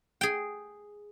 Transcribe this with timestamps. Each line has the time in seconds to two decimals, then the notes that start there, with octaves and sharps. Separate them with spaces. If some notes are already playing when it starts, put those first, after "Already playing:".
0.21 G#4 G5